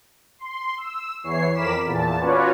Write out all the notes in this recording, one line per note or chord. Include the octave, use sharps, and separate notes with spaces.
C6
E6
E2 E3 C#5 C7
F2 A#4 B5 D6 B6 E7
E2 A#2 A5
C#4 F4 F#4 B4 C#5 D5